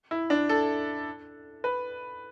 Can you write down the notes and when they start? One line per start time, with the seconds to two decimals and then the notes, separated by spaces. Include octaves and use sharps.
0.11 E4
0.30 D4
0.49 A4
1.64 B4